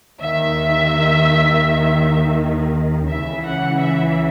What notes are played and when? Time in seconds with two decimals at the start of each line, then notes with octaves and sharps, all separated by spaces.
0.20 D#2 D#3 E5
3.09 C#2 C#3 E3 E5
3.45 F#5
3.80 E5